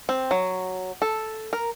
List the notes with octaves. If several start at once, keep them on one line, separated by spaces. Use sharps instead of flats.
C4
F#3
A4
A#4